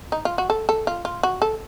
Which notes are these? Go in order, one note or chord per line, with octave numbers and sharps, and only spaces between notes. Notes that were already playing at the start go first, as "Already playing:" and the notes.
D#4
F4
F#4
A4
A4
F4
F4
F#4
A4